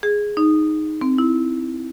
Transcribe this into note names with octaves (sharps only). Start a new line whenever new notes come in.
G#4
D#4
C4
E4